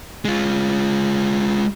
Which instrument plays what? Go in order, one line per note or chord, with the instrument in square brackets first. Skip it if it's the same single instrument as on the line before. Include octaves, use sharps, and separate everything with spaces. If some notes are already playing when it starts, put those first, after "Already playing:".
[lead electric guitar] G#3 F4